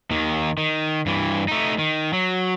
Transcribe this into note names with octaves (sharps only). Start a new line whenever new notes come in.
D#2 D#3
D#3
G2 E3
A3 D#4
D#3
F#3